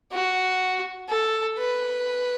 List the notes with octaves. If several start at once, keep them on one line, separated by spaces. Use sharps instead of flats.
F#4
A4
B4